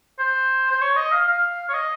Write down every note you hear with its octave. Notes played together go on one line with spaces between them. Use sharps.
C5
C5
C#5
D#5
F5
F5
C#5
D#5